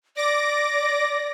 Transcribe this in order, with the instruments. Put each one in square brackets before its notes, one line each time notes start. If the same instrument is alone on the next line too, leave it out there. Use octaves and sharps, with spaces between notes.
[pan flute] D5 [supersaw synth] D6 A#6